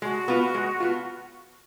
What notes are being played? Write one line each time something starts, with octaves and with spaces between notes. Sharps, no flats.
G#3 F#4
B3 F4
G#3
B3 F4